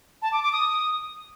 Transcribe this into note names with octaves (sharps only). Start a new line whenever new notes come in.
A5
D6
D6
D#6